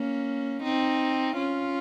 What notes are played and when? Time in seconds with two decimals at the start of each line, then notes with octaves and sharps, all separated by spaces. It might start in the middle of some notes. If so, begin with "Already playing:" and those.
Already playing: A#3 C#4
0.63 C4 D#4
1.36 C#4 F4